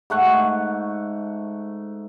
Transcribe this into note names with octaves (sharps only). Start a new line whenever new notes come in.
G#2 A3 F#5 C#6